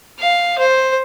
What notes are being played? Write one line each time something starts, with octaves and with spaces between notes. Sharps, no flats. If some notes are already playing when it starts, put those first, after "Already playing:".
F5
C5